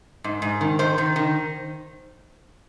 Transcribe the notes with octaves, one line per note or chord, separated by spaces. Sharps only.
G#2
G#2
D#3
D#3 C5
D#3
D#3